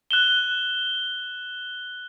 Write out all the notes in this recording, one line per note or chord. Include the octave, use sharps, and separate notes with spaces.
F#6 E7 G7